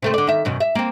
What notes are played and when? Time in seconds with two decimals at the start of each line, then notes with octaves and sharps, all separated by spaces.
0.02 C3 A3 C4
0.14 D3 D5
0.27 D#3 E5
0.45 F#2 B2 D#3
0.60 E5
0.75 A#3 C4